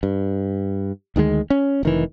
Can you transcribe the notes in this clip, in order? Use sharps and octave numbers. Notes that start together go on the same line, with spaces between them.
G2
D2 D#3 F3 G#3
C#4
F1 D#3 E3